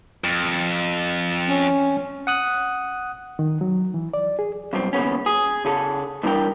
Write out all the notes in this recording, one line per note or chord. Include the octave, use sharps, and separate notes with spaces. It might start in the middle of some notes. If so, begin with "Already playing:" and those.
F2
C#4
F#5 D#6 F#6
D#3
F#3
E3
D5
G#4
B1 G2 C4
D#2 C#3 B3 C#4
G#4
C#3 G#4 A4
G2 E3 G3 D4 A#4 G5